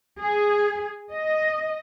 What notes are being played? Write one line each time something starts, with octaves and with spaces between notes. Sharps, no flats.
G#4
D#5